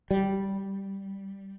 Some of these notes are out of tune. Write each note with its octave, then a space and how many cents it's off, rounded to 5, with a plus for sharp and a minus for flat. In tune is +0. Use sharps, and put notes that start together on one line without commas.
G3 -5